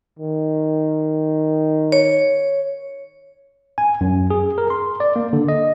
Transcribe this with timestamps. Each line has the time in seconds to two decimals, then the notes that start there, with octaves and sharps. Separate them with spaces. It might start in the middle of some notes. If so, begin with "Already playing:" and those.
0.19 D#3
1.92 C#5
3.78 G#5
4.01 F#2
4.30 G#4
4.58 A#4
4.70 C6
5.00 D5
5.16 A#3
5.33 D3
5.48 D#5